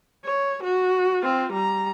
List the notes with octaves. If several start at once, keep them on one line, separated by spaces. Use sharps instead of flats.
C#5
F#4
C4 F4
G3 A#5